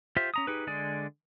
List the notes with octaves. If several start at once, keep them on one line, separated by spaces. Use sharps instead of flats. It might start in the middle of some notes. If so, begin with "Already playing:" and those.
F4 G4 C5 E5
C#4 A#5 D#6
D#4 G4 G#4 B4
D3 G#3 G#4 D5 G#5